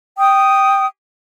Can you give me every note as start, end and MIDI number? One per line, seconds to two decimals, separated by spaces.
0.19 0.87 79
0.19 0.87 87